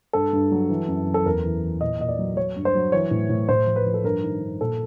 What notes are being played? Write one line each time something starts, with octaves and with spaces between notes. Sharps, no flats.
G2 A4
G2
F#3
E3
F#2
F#2
A4
E2 A#4
E3
E3
A#2 D#5
A#2 D#5
D5
F#3
F#3 C#5
G2
C5
F#3
E3 C#5
A2
A2
A2 C5
F3
B4
F3
A4
G2 A#4
D#3
G2
A#2 A4